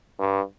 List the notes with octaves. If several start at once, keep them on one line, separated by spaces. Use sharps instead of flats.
G2